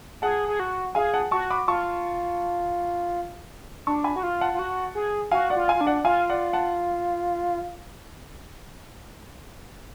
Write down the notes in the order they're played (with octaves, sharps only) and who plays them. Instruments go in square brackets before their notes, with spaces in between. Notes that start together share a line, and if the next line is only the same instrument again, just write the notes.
[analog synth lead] G#4 [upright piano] F#5 A5
[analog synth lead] G#4
F#4
[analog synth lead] G#4 [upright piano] F5 G#5
[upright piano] F#5 A5
[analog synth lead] F#4 [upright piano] A5 C#6
[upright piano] B5 D6
[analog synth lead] F4 [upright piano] A5 C#6
[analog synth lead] D4 [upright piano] A5 C#6
[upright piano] G#5 B5
[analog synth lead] F#4
F4
[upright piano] F#5 A5
[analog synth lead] F4
F#4
G#4
[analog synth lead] F#4 [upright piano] F5 G#5
[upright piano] D5 F#5
[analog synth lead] F4
[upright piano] F5 G#5
[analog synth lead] F4
D4
[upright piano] D5 F#5
[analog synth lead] F4 [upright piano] F5 G#5
[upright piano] D5 F#5
F#5 A5